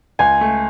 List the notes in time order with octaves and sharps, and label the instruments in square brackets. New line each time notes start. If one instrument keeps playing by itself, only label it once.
[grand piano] C#2 [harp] G#5
[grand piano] A3